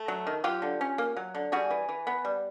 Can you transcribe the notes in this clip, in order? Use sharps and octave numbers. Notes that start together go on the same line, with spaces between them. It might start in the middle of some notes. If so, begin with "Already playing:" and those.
Already playing: A3
F#3
D#3
F#3 F4 G4
D3
C#4
A#3
F#3
D3
G3 F#4 G#4
E3
E3
B3
G3